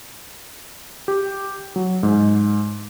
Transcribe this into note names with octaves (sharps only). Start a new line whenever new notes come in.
G4
F#3
G#2